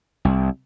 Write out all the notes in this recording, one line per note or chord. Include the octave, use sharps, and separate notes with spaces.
C2